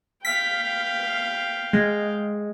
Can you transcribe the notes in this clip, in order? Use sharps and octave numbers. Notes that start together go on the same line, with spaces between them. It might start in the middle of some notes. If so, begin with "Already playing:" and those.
F5 G5 B6
G#3